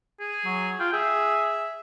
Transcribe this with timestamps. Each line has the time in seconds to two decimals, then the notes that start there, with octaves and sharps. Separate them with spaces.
0.20 G#4
0.45 F#3
0.80 F4 G5
0.93 G#4 E5